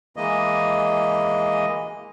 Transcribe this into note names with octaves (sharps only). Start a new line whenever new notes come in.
E3 G#3 A#3 D#5